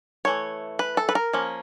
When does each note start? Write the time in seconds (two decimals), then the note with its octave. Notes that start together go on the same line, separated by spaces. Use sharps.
0.25 E3 A3 C#5
0.79 B4
0.97 A4
1.09 B4
1.15 A#4
1.33 F3 A#3 C#4